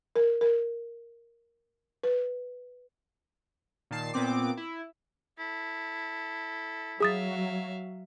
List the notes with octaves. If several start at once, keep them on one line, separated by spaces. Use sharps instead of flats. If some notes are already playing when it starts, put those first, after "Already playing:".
A#4
A#4
B4
A#2 D#3 A5 C7
A#2 B3 C4 D6
E4
E4 A4
F#3 G#4 E5 F5 D#6 A6